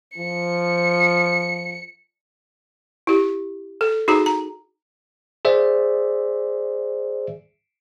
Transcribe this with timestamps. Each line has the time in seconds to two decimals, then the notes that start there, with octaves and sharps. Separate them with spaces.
0.18 F3 C#7
3.07 E4 G4
3.81 A4
4.08 D#4 F#4 G#4 A#5
4.26 A#5
5.45 G#4 C5 D5 E5